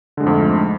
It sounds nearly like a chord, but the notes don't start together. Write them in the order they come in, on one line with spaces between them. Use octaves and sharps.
D3 G#3 G#2 F2 A3